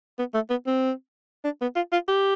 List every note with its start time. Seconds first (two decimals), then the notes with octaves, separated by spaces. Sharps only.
0.19 B3
0.34 A3
0.50 B3
0.67 C4
1.44 D4
1.61 B3
1.76 F4
1.93 F4
2.08 G4